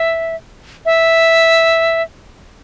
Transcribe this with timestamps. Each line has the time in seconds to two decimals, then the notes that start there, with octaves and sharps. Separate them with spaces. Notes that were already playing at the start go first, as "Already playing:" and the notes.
Already playing: E5
0.86 E5